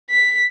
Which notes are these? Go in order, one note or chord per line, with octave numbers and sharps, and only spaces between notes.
B6